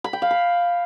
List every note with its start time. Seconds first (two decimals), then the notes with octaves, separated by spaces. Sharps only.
0.04 B5
0.13 G5
0.22 F5
0.31 B5